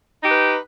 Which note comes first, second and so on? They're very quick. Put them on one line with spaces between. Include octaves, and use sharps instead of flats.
D#4 G4 B4